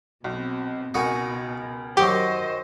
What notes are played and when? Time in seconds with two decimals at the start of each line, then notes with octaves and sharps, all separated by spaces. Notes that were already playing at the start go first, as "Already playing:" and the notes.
0.24 B1 B2 C4
0.94 C#2 B2 D#4 F#4 A#4 G#5
1.97 F#2 D#3 F#3 G4 C5 D#5